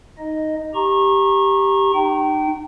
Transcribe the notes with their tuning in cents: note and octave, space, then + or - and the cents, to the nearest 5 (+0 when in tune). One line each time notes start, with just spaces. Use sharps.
D#4 +0 D#5 +0
G4 +0 A#5 +0 C#6 -30
D#4 -30 G5 -30